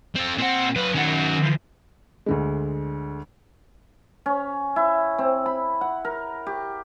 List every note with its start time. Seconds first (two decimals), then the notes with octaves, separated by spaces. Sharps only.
0.16 C4 A4
0.38 A#2 C4 F#5
0.76 F#3 B4 F5
0.94 D#3 C#4 F#4 F#5
1.42 E3 F3
2.26 D2 D3 G#3
4.26 C#4
4.76 E4
5.18 C4
5.46 B5
5.81 F#5
6.05 A#4
6.47 G4